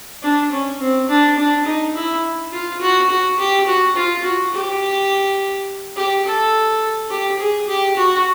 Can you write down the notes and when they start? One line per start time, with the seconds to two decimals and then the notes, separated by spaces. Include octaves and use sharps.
0.23 D4
0.52 C#4
0.80 C4
1.09 D4
1.38 D4
1.66 D#4
1.95 E4
2.52 F4
2.81 F#4
3.10 F#4
3.39 G4
3.67 F#4
3.96 F4
4.24 F#4
4.53 G4
5.96 G4
6.25 A4
7.10 G4
7.39 G#4
7.68 G4
7.97 F#4